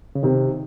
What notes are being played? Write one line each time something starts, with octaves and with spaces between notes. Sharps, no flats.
C#3
C3 D#3